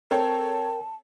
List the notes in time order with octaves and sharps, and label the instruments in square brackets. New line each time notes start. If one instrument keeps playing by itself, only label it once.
[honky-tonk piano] C4 A4 C#5 [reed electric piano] A#4 G5 [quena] A5